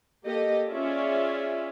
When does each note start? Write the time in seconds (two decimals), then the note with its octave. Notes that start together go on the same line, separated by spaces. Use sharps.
0.25 A#3 G4 A4 D#5
0.69 C#4 F4 G#4 C#5 D5 E5